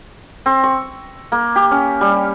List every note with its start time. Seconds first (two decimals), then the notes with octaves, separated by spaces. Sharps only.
0.46 C4
0.64 C#6
1.32 A#3
1.56 G4
1.71 C#4
2.01 G3